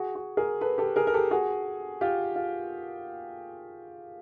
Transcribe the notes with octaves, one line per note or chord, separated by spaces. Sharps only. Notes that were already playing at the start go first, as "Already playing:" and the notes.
Already playing: F#4 G#4
F#4
G#4 A#4
A4 B4
G4 A4
G#4 A#4
A#4
G4 A4
F#4 G#4
F4 G4
F4